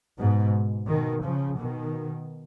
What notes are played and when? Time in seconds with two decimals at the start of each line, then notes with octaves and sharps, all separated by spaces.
0.19 G#2 B2
0.88 B2 D#3
1.24 C#3 F3
1.59 B2 D#3